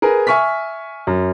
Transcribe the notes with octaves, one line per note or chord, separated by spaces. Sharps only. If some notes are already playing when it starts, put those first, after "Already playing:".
G#4 A#4 B4
E5 G#5 C#6 F6 B6
F#2